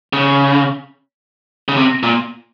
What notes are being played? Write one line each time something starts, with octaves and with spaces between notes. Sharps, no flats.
C#3
C#3
C3
A#2